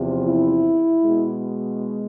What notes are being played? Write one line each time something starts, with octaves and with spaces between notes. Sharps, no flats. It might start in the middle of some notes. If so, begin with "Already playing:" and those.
Already playing: E2 C3 F3
E4
B2 G#3